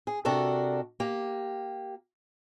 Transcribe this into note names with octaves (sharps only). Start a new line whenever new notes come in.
G#4
C3 D4 F#4 A4 A#4
A#3 G4